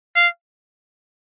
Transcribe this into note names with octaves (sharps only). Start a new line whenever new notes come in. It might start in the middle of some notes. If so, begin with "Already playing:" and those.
F5